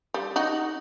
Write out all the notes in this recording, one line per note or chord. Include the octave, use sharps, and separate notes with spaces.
G3
D#4 F#4